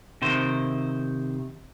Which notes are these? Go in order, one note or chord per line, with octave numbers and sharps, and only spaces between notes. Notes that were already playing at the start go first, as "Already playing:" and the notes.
C3 D#3 C5